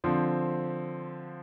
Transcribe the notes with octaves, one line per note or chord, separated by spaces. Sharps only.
D3 F3 C4